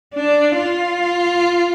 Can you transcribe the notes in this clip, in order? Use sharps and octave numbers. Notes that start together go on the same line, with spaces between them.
D4
F4